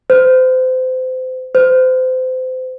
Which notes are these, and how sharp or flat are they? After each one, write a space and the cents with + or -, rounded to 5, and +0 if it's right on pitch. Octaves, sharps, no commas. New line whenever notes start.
C5 -30
C5 -30